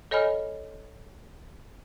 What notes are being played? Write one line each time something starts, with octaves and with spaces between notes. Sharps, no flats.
A4 C#5 D#5 G#5 B5 F6